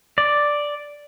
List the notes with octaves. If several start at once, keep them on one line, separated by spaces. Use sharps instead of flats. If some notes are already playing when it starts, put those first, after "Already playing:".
D5